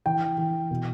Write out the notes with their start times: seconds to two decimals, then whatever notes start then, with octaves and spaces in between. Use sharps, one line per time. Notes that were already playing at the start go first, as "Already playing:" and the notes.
0.06 E3 G5
0.38 E3
0.71 B2